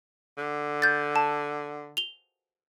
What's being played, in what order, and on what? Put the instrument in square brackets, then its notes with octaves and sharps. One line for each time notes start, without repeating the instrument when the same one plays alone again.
[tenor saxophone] D3
[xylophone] G6 A6
A5
F7 G7